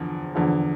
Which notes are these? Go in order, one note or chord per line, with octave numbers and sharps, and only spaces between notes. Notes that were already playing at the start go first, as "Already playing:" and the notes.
Already playing: E2 D3 F3
E2 D3 F3